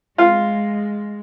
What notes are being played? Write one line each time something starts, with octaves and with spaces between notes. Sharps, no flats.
G#3 F4